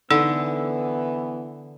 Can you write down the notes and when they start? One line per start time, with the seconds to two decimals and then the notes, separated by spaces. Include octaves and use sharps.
0.10 D3 E3 B3 D#4 A4 E6